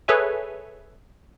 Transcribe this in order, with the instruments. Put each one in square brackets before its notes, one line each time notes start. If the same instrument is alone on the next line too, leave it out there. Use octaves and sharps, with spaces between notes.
[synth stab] G#4 A4 B4 C#5 E5 G#5